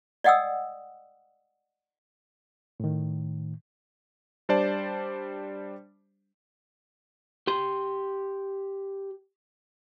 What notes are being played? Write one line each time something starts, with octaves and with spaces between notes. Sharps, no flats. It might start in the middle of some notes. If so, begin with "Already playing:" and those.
D5 D#5 F#5 G5 D#6 E6
A2 D#3
G3 D4 C5 D5 A5
G4 C6